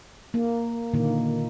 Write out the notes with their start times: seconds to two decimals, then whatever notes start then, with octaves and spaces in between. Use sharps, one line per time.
0.34 A#3
0.94 A#2 D3 D#3 A#3